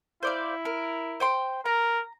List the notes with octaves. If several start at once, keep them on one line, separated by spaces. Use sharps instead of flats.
E4 C5 D5 F5
A#4
C5 G5 C6
A#4 A#5